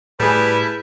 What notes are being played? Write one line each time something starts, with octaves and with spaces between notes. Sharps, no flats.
A2 G3 E4 G#4 B4 E5 A5